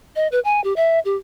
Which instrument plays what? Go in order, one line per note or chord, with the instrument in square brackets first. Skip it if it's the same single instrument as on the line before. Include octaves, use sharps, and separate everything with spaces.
[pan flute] D#5
B4
G#5
G4
E5
G4